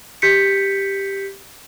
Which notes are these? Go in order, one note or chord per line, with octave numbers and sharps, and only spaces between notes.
G4 G6 B6 C#7